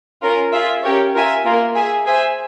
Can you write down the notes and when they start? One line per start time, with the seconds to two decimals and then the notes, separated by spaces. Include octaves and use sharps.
0.22 C#4 F4 A#4
0.52 F4 G#4 E5
0.83 C#4 G4 A#4 C#5
1.15 F4 A#4 E5 G#5
1.45 A#3 F4 A#4
1.75 G#4 E5 G#5
2.06 G#4 C5 E5 G#5